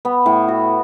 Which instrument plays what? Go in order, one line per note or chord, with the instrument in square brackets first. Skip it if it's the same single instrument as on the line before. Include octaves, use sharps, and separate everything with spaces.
[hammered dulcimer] B3
A2
F#4